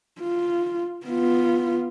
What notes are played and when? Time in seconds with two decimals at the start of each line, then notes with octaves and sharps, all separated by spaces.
0.22 F4
1.06 B3 F4